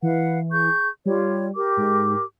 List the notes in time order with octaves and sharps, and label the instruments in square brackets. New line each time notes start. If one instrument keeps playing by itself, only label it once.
[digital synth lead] E3 [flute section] B4 F5 F#5
[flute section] G#4 C#6 G6
[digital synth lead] G3 [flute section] F4 G4 C#5
[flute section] G4 A#4 D6
[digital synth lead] G#2